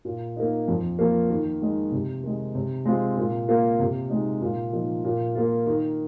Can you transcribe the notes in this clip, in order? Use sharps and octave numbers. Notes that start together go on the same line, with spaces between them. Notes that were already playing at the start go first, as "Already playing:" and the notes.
A#2
A#3 D#4
F2
F3 A#3
D#3
G#3 D#4
C3
D#3 G#3 D#4
C3
G#3 C4 F4
A#2
A#3 F4
C3
G#3 D#4
A#2
F3 A#3 D#4
A#2
A#3 F4
D#3